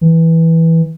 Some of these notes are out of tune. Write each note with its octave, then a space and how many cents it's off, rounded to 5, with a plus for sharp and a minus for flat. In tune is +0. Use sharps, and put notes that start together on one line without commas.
E3 -10